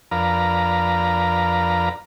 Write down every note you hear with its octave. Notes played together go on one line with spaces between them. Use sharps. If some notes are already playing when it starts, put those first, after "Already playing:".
F2 D4 A#4 B4 F5 A#5